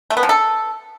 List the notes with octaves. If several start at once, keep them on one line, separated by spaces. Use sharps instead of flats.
A3
B3
F3
A4